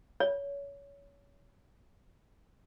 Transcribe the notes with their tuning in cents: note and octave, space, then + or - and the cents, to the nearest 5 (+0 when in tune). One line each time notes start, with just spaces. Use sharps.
C#5 +25